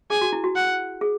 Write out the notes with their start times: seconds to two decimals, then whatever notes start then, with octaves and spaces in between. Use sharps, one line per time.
0.10 G#4 G#5
0.21 F#4
0.32 E4
0.44 F#4
0.56 F#5
1.01 G#4